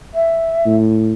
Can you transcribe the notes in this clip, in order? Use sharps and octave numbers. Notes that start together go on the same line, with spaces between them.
E5
A2